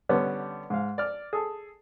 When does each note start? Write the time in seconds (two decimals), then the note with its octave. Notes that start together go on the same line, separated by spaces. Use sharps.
0.09 D3 G3 B3 C#4
0.70 G#2 F5
0.98 D5 F6
1.33 G#4 A4